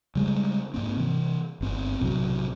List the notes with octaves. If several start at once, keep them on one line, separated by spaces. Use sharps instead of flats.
C#3 G3 G#3
G#2 A#3 C4
C3 E3
G1 C4
B1 A2 C3 F#3